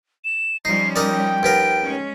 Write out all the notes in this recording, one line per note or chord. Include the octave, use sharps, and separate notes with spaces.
E7
F3 G3 C#4 D#4 C7
D#4 A#4 D5 G5 D#6
D#2 B3 A#4 D7
G#3 C#4